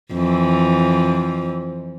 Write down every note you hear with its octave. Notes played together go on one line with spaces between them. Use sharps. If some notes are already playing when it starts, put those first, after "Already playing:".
F2 E3